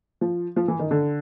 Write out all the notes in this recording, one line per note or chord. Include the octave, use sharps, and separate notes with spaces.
F3
F3
E3
D#3
D3